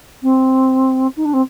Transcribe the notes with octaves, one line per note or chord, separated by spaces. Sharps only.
C4
D#4
D4
C4